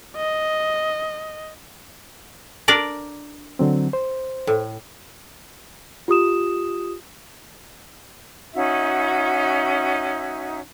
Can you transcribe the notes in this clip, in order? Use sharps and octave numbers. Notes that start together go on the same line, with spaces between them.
D#5
D4 A#4 D5
D3 F#3 C4
C5
A2
F4 G4 D#6 E7
C#4 D#4 F#4 E5